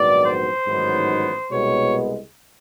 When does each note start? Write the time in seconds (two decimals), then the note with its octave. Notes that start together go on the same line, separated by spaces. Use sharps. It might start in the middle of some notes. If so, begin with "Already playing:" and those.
Already playing: A#1 G#2 D#3 F#3 B3 D5
0.24 C5
0.67 A1 G#2 D#3 F#3 B3
1.50 C2 B2 G#3 B3 C#5